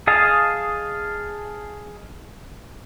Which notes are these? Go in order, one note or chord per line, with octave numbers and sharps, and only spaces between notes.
G#4 D#5 F5 A5